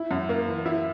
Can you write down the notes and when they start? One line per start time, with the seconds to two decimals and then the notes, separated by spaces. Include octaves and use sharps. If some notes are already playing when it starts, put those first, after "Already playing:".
Already playing: E4
0.11 F#2
0.29 A#3
0.47 E3
0.66 E4